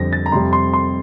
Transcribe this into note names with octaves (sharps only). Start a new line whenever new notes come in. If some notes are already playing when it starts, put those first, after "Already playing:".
Already playing: F2 D3 G3 C4 A#6
A6
A#5
F2 C3 G3 C6
C6
C6